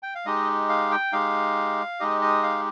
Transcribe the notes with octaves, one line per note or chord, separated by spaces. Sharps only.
G5
F5
G#3 D#4 G4 D#5
F5
G5
G#3 D#4 G4 F5
G#3 D#4 G4 D#5
D#5
F5